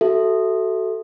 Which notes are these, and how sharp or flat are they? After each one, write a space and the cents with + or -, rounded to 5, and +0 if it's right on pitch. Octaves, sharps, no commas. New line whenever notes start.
F#4 +25 A4 +0 E5 +0